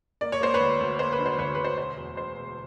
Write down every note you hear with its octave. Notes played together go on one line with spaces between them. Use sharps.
A#3 D5
C#5
A#3 C5
B4 C#5
D2
D2
A#3 C5
B4
D3
C5
D2 B4 C#5
D2 B4
C5
E1 C5
E2
E1 C5
E1